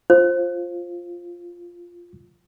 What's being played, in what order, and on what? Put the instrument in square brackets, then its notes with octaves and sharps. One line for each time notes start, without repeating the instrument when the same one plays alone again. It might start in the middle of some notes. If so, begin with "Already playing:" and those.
[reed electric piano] F4 [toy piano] C5